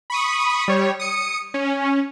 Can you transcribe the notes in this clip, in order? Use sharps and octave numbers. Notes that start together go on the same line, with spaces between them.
B5 C#6 D#6
G3 C#5
D#6 C#7
C#4